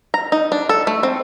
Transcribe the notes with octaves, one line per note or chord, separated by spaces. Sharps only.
A#5
D#4
D4
A4
A3
C4